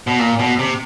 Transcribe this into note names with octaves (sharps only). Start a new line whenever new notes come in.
B2
A#2
B2
C3